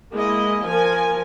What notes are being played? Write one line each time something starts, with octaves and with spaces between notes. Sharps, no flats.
G#3 A#3 E4 D#5
F3 A#4 G#5